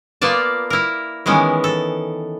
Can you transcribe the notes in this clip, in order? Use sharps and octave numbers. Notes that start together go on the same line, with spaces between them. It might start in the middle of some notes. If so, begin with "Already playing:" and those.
A#3 B3 F4 D5 A5
E4 A#4
D#3 E3 G#3 B3 C#4
A4